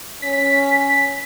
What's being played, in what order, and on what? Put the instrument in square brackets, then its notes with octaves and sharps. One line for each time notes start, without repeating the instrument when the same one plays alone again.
[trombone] C#4 [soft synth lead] B6